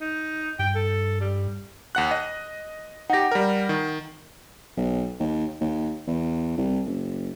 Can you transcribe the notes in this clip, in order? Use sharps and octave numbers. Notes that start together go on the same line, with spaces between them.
D#4
G2 G5
A4
G3
D#2 F#5 F#6
D#5
D#4 G4 F#5 A#6
G3 A#4
D#3
B1
D#2
D#2
E2
C2
F#1